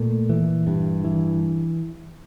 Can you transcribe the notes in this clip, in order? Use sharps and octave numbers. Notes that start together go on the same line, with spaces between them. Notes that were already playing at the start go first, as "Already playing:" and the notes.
Already playing: A#2 A3
E3
G2
E3